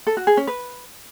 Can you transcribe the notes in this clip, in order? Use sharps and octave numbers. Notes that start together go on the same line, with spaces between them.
A4
F#4
G#4
C#4
B4